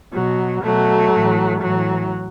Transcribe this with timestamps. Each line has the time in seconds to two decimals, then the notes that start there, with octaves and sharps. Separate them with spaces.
0.13 B2 F#3
0.63 B2 F#3 A3
1.13 A2 E3
1.62 A2 E3 F#3